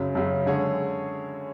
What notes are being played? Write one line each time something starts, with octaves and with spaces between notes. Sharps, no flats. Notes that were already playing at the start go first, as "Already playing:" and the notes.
Already playing: F#2 C#3 F#3
F#2 C#3 F#3
D3 G#3 C#4 G#4 C#5